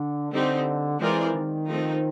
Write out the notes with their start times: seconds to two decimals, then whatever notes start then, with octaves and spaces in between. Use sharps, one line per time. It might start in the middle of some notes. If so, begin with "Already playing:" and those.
Already playing: D3
0.32 D3 G3 C4 D#4 G4
0.99 E3 G#3 C4 F4 A#4 D5
1.33 D#3
1.68 F3 A3 C4 D#4